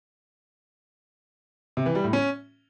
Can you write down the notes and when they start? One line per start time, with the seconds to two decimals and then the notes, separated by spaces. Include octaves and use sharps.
1.77 C3
1.86 E3
1.95 G3
2.04 A2
2.13 C#4